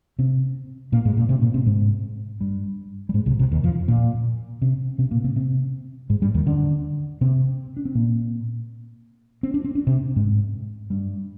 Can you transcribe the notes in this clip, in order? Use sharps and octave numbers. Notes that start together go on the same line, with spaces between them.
C3 C4
A#2 A#3
G#2 G#3
A#2 A#3
C3 C4
A#2 A#3
C3 C4
G#2 G#3
G2 G3
G3
G#2 G#3
C2 C3
C2 C3
D#2 D#3
F2 F3
A#2 A#3
C3 C4
C3 C4
A#2 A#3
C3 C4
C3 C4
G#2 G#3
G2 G3
D#2 D#3
D3 D4
C3 C4
D4
C4
A#2 A#3
C4
D4
C4
D4
C3 C4
G#2 G#3
G2 G3